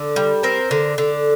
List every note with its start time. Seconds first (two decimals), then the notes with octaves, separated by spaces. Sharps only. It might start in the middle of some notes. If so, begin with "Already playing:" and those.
Already playing: D3
0.16 G3
0.43 C4 A#4 C5
0.71 D3
0.98 D3